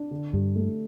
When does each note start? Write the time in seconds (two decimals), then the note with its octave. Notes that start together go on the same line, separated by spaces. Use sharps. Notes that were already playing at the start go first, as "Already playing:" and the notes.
Already playing: D4
0.11 D3
0.33 G2 G4
0.55 A3